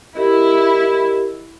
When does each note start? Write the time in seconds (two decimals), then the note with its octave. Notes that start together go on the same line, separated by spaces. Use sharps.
0.15 E4 G4 A#4 D#5